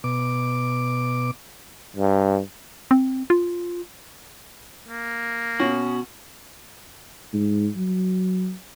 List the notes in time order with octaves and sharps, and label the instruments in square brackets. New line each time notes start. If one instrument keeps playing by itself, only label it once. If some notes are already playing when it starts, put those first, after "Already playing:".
[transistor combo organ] B2 D6
[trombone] G2
[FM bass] C4
F4
[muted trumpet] A#3
[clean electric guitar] B2 F#4 [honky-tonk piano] C#4
[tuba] G#2
F#3